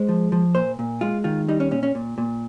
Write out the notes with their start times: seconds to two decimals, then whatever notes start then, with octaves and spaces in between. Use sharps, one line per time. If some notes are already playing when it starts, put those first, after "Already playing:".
Already playing: G#3 C5
0.09 F3
0.32 F3
0.55 A#2 C5
0.79 A#2
1.01 G#3 F4
1.24 D#3 F4
1.48 G3 D#4
1.60 C#4
1.71 A#2 C#4
1.83 C#4
1.95 A#2
2.18 A#2